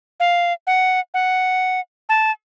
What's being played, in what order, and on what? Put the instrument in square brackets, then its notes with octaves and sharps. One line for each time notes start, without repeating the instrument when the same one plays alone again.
[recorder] F5
F#5
F#5
A5